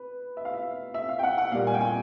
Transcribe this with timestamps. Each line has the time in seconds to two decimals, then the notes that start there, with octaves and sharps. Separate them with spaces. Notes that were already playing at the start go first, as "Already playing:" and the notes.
Already playing: B4
0.37 E5
0.45 F5
0.54 E5
0.94 E5
1.09 F5
1.19 G5
1.23 F#5
1.38 F#5
1.52 A#2 G3 A#3 F5
1.67 G#5
1.74 G5
1.81 G#5